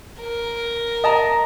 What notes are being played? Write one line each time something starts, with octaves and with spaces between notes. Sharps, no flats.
A#4
D#5 A5 A#5